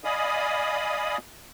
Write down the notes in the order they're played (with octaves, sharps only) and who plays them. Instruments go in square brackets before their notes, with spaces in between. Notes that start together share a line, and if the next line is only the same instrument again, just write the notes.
[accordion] D5 D#5 F5 G#5 B5 D#6